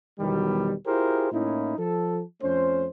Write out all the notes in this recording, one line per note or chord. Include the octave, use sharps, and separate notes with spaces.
E2 B2 D#3 F#3 G3
E4 F4 G4 G#4 A#4 C5
A2 A#3 C#4 D#4 E4
F3 A4
F2 A3 C#4 C5